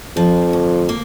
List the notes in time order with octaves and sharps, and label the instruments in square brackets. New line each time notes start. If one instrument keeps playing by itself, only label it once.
[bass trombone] F2 [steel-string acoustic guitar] F3
[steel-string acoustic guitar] D2
A#3